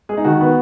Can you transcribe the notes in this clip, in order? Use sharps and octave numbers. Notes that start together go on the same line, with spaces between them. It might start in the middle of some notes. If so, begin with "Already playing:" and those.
G#3 G#4
D#4
D#3 F#4
B3